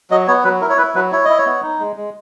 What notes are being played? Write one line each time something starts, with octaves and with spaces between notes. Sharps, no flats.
F#3 D#5
B3 C#5
F#3 B4
E4 A#4
C#5
E4 B4
F#3 B4
E4 C#5
E4 D#5
C#5
B3
D#4
G#3
G#3